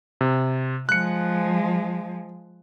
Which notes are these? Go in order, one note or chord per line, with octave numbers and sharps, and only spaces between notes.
C3
F3 G#3 F#6 C#7